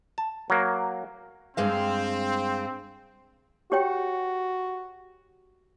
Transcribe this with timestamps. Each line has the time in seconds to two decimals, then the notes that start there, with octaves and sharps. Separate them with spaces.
0.18 A5
0.50 F#3 A#3
1.57 G2 G#3 C4 F5
3.72 F#4 G4 C#5 G5